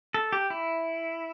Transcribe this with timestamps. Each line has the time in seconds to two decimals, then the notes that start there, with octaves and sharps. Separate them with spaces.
0.14 A4
0.33 G4
0.50 E4